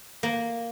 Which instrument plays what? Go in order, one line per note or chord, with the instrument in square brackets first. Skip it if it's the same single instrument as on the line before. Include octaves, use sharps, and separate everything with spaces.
[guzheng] A#3